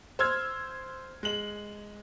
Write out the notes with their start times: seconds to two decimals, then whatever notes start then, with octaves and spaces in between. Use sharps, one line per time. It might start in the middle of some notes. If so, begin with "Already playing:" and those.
0.19 C5 E6 F6 G#6
1.23 G#3 F#7